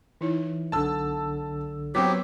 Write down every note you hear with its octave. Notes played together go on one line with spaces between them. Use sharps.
E3 D#4 E4 C#5
B1 D3 A5 E6
F#3 B3 C4 G4 C#5 E6 B6